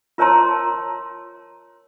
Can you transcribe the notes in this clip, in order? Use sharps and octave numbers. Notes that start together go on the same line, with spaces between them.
F4 A#4 C#5 A5 A#5 C6